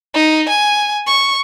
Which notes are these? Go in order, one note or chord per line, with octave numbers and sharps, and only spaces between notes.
D#4
G#5
C#6